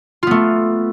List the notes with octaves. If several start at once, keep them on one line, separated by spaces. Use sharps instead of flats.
A3 B3 F4